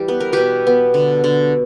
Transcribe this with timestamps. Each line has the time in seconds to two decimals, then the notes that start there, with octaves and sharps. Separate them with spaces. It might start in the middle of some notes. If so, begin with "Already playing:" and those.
Already playing: E3 G3 G4
0.08 B3 B4
0.20 A#4
0.32 B2 G4 B4
0.67 B3
0.94 D3
1.24 D3